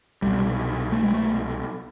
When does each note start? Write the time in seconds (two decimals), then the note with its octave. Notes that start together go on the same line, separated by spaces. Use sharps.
0.22 C2 B2 G3
0.92 A3
1.03 G#3
1.14 A3